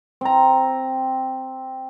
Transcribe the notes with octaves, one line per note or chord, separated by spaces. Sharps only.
C4 A#5